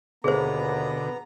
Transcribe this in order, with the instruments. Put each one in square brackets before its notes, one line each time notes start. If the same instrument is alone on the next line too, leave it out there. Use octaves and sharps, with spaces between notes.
[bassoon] D#2 [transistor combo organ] B2 D3 [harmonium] B3 A#5 [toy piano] G#4 C5